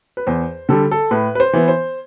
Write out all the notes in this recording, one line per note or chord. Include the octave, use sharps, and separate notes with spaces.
B4
E2 C5
D3 G3 A4
A4
A2 B4
B4
C5
E3 B3
C5